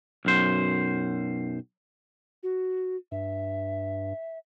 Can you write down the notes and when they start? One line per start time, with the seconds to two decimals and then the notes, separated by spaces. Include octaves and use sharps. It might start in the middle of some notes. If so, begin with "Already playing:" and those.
0.25 B1 F#2 C5
2.43 F#4
3.12 G2 E5